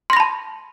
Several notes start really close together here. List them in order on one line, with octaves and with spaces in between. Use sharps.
C6 A#6 B5 A5